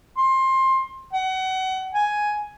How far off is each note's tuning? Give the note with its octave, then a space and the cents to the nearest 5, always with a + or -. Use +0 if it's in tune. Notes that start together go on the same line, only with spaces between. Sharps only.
C6 +20
F#5 +30
G#5 +5